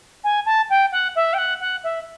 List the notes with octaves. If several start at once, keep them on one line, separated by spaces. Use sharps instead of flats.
G#5
A5
G5
F#5
E5
G5
F#5
F#5
E5